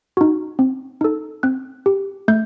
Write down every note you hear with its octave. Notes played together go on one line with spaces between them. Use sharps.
D#4 F#4
C4
D#4 A4
C4 F#6
G4
A3 G6